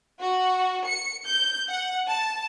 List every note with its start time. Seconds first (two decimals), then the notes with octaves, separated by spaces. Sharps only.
0.20 F#4
0.85 C#7
1.26 G6
1.67 F#5
2.07 A5